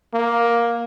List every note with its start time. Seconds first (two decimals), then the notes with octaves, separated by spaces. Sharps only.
0.14 A#3